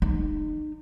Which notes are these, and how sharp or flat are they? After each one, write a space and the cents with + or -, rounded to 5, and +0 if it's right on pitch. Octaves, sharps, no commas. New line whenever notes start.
D#4 -35